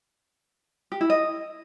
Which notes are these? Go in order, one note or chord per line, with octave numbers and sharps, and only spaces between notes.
G4
E4
D#5